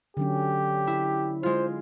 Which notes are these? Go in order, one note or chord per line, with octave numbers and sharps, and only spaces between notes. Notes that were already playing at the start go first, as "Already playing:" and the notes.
D3 F#3 C#4 G4
E4
G#3 F4 C5